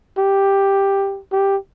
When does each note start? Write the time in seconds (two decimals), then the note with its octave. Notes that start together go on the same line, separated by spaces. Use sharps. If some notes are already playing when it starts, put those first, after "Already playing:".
0.18 G4
1.32 G4